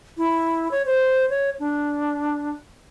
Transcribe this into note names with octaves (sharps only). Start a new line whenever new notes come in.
E4
C#5
C5
C#5
D4